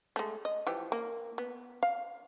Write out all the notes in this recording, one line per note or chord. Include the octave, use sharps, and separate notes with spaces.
G#3 A3
D#5
E3 F3 G4
A#3
B3
F5